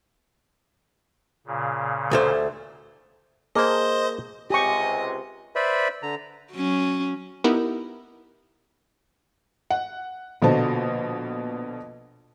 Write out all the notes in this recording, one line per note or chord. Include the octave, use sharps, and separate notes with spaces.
A#2 C#3
D2 A3 C5
A#3 G#4 C5 D#5 A5
C#2 C3 G4 D#5 G#5 C#6
B4 C5 D5 E5 B5
D3 A#5
F#3 C#4
B3 D#4 E4 G4 A#4
F#5
A#1 B2 D3 C5 A5